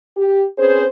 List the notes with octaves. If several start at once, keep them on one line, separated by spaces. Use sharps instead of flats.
G4
C4 C#4 G#4 B4 C5